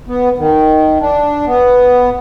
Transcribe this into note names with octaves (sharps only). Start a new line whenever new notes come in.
B3
D#3
D4
B3